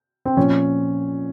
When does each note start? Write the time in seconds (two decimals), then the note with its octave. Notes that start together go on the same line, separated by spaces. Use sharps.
0.25 C4
0.37 A#2 F3 C#4